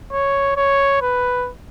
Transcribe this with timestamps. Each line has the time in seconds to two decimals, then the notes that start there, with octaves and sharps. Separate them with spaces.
0.12 C#5
0.57 C#5
1.02 B4